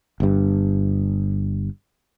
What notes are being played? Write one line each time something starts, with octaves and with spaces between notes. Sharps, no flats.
G1 G2